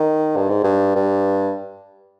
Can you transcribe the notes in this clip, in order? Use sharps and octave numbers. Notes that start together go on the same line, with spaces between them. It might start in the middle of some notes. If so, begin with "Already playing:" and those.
Already playing: D#3
G2
G#2
G2
G2